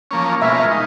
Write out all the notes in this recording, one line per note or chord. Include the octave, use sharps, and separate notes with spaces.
F3 A#3 C#4
B2 G#3 C#4 F4 A#4 E5
D#4